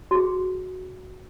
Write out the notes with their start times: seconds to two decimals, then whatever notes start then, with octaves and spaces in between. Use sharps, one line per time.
0.11 F#4 G#4